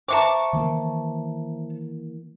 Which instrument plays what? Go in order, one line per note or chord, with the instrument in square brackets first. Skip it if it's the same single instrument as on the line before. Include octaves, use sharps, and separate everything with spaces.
[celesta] C5 E5 A#5 [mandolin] A5 C#6 D6
[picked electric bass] D#3 E3 A#3